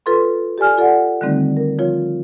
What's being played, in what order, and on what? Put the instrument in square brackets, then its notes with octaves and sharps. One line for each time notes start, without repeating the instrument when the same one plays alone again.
[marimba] F4 A4 B4 C6
G4 A4 D5 G#5 F6
F4 A4 D5 F#5
D3 D#3 G3 A3 C4 D#4
A#4
F3 F4 C#5